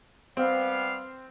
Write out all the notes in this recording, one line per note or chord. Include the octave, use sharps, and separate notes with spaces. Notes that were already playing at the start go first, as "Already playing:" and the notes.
G3 B3 C4 F5